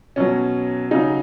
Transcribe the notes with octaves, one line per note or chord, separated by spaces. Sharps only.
B2 F#3 C#4
C#3 F#3 D#4